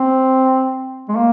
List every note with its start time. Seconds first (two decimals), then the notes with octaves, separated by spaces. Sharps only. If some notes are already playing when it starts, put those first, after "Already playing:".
Already playing: C4
1.09 G#3
1.16 A#3